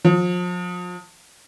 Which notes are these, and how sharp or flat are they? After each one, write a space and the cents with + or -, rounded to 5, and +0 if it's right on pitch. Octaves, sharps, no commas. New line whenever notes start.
F3 +35